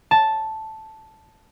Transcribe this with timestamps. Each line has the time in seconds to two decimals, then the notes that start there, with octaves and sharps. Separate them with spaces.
0.11 A5